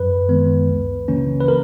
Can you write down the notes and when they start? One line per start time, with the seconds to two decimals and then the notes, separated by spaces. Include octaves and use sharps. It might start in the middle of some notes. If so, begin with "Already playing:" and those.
Already playing: F#2 B4
0.29 D#3 G#3 B3
0.69 C#2
1.08 C#3 E3 A#3 C#4
1.40 B4
1.48 A#4